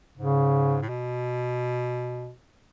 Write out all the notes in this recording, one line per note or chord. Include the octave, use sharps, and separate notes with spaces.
G#2 C#3
A2
B2